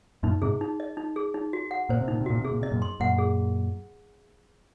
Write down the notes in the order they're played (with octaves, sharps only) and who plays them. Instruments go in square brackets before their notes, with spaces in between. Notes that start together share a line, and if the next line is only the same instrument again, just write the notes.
[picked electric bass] F#2 A#2 [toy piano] D#4
[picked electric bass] G#2 C3 [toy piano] G#4
[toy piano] D#4
D#5
D#4
G#4
D#4
F#4
F#5
[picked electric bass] A#2 [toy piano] C5
[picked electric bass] C3
[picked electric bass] A#2 [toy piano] D#4
[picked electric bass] C3
[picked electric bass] A#2 [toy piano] F#4
[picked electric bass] C3 [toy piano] G#4
[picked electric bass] A#2
[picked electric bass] C3 [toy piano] D#5
[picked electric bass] F#2 A#2
[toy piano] C6
[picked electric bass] F#2 A#2 [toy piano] F#5
[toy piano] G#4